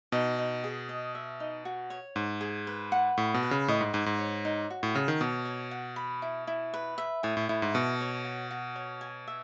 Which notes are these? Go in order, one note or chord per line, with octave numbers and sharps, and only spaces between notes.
B2 D#4
D#4
G#4
D#5
E5
D#4
F#4
C#5
G#2 C#6
G#4
B4
F#5
A2 B5
B2
B4
C#3
A2 D#5
G#2
G#2 G#5
G#2
C#5
D#4
F#4
A2
C#3 A4
D#3
B2 C#5
C#5
F#5
B5
E4
E4
B4
E5
A2 G#5
A2
A2 E4
G#2
B2 A4
C#5
F#4
F#4
C#5
G#5
E5